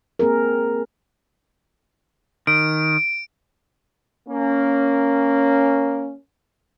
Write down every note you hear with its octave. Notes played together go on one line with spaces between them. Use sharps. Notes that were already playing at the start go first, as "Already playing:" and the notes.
A#3 C4 G#4 A#4
D#3 D7
A#3 C#4